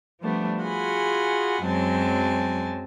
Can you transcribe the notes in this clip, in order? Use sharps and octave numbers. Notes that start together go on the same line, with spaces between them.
F3 G3 A3 B3 D4
F4 F#4 G#4 F#5 G#5 B5
F#2 F#3 G#3 C4 G#5 A5